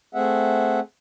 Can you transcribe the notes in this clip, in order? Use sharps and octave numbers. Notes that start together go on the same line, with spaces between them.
A3 C4 G#4 E5 F#5